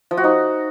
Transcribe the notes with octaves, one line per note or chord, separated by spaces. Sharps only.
F3
F#4
D#4